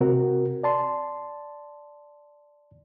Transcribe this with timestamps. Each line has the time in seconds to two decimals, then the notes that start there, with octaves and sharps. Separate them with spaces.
0.01 C3 C4 F#4 A#4
0.63 D5 A5 C6